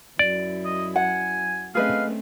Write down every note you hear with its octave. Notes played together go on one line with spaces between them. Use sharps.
F#2 E4 D5
D#5
F#5 G#5
A3 C4 C#4 G#4 B4 D#5 F5